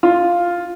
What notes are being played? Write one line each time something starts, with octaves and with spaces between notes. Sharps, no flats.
F4